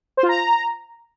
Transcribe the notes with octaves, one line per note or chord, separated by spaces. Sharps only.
C5
F4
A#5